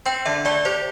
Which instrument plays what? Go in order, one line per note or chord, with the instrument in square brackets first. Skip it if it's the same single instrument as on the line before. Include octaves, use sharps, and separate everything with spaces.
[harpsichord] C4 [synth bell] G5
[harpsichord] D3 [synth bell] E5
[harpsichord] A3 [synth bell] D5
[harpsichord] G4 [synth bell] C5